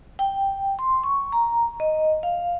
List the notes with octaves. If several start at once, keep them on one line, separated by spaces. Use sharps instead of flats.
G5
C6
C#6
A#5
D#5
F5